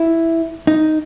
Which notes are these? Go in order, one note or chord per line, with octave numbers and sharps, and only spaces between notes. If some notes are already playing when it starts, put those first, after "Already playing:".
Already playing: E4
D#4